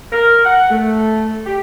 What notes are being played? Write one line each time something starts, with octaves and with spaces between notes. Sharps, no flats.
A#4
F#5
A3
G4